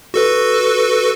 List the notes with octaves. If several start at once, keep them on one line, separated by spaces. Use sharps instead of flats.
F#4 A4 B4